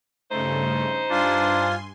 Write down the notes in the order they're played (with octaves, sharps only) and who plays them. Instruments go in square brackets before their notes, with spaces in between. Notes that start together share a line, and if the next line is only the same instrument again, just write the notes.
[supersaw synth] G2 C#3 A3 [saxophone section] D#4 C5
[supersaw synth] G2 G#5 C6 [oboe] D4 [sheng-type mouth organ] F4